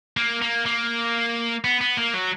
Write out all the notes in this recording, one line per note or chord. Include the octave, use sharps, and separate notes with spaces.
A#3
A#3
A#3
B3
B3
A#3
F#3